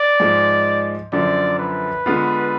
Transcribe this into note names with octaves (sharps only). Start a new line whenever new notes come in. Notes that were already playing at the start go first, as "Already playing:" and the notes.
Already playing: D5
G#2 F3 G#3
F#2 D3 F3 D5
B4
D3 G#3 B3 F4